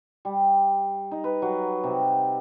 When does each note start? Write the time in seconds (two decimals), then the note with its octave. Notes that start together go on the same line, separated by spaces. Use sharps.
0.25 G3
1.11 D#4
1.24 B4
1.42 F#3
1.84 C3